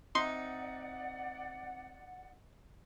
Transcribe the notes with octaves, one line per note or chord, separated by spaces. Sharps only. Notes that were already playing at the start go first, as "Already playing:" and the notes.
C4 D#4 D5 E5 F#5 C6